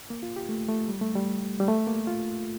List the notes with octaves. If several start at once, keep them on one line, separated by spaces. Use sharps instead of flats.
A#3
F4
G4
A3
A3
G3
A3
G3
G3
A3
A#3
F4